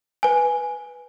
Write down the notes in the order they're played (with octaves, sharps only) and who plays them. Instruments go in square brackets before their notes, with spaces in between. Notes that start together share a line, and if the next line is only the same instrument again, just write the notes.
[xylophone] B4 G#5